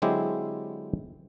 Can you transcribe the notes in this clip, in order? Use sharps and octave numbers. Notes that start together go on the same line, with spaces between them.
D3 F#3 G#3 C4 E4 G4